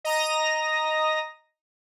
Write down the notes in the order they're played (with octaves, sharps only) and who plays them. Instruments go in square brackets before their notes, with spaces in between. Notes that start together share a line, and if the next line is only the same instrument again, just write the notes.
[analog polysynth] D#5 A#5 D#6 A#6